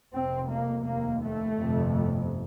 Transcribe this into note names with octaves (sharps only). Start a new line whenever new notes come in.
F1 F2 C3 C4
A#3
F1 D#2 A#3
A3
G1 F2 C3